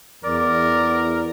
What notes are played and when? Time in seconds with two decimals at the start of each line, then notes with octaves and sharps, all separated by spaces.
0.24 E2 A#4 D5